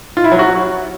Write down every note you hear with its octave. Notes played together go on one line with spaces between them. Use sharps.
F4
E4
F#3
F#4